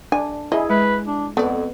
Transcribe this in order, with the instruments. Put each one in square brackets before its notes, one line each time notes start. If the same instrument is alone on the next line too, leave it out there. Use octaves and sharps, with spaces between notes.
[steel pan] D4 [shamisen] G#5
[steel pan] E4 G#4 [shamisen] D#5 E5
[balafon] G#3 [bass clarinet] B4
[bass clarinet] D4
[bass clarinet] F2 [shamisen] A3 D5 [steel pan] B3